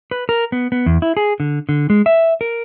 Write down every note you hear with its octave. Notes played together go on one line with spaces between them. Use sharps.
B4
A#4
B3
B3
E2
E4
G#4
D3
D3
G#3
E5
A#4